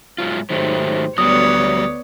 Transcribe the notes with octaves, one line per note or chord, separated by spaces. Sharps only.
G#2 F#3 F4
G#2 D#3 F#3 A3 G4 C5
D2 F#3 G3 B3 C#5 D5 D#6